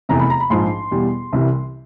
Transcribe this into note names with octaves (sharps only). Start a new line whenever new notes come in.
F1 E2 C3 A#5
B5
A#5
B5
A#1 G#2 F3 C6
E2 B2 G3
C2 C3 E3 G3